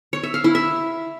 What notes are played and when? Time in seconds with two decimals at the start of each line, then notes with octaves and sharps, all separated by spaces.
0.13 C#5
0.23 E5
0.34 F5
0.44 E4
0.55 E5